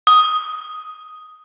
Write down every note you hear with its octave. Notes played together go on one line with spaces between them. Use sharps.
D#6